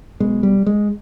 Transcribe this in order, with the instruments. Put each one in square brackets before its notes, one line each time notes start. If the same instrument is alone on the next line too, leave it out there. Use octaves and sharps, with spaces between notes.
[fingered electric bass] B1 B2 G#3
G3
G#3